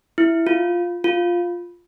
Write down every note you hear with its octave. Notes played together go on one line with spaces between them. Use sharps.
E4
F4
F4